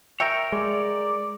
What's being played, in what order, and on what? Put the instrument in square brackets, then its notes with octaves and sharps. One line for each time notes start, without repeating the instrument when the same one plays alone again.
[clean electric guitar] A#4 C#5 [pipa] E5 G5
[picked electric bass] G#3 [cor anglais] D5